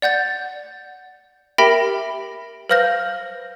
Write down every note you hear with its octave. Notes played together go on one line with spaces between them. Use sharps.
D5 F#5 G6 A6
G4 A#4 E5 G5 B5 A#6
B4 C5 F5 F6 G6 A#6